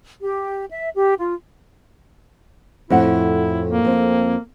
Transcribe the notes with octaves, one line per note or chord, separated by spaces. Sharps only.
G4
E5
G4
F4
F2 A2 E4 F#5
A#3
F2 C4